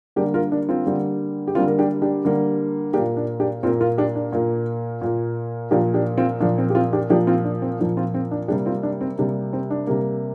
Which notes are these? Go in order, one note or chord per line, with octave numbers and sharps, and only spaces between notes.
D3 G3 A#3 D4 G4
F4 A#4
D4
C4 F4
D3 G3 A#3
G4
D3 G3 A#3 C4 F4
A#4
D4 G4
D4 G4
D3 G3 A#3
A#2 A#3 D4 G4
D4
D4 G4
A#2 A#3 C4 F4
F4 A#4
D4 G4
D4
A#2 A#3
A#2 A#3
A#2 F3 A#3 D4 G4
D4 G4
C4 F4
A#2 F3 A#3 D4
C4
G4
C4 F4
D4 G4
A#2 F3 A#3 D4 G4
C4 F4
D4
C4
A#2 F3 A#3 D4
C4 F4
C4
D4
C3 G3 A#3 D4 G4
C4 F4
D4
C4
C3 G3 A#3 D4
C4
D4
C3 G3 A#3